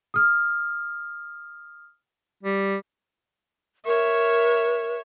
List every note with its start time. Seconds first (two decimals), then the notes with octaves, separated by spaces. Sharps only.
0.14 D#6 F6
2.43 G3
3.86 A#4 C#5 E5